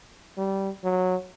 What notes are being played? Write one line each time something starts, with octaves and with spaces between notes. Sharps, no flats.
G3
F#3